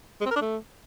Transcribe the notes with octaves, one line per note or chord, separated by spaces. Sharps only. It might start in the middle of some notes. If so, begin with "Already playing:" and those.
G#3
C4
A#4
D4
A3